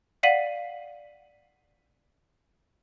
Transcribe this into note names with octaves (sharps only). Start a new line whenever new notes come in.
D5 F5 F#5 B6 D#7 F#7